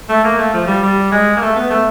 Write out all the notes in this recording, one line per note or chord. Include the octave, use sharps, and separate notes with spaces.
A3
A#3
A3
F3
G3
G3
G#3
A#3
A3
B3
A3